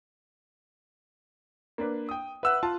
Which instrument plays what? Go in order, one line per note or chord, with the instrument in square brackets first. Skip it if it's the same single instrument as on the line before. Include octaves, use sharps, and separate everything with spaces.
[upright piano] A#3 D4 B4
G5 D#6
[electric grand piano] B4 E6 [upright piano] E5 F#5 F#6
[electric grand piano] F4 [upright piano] A5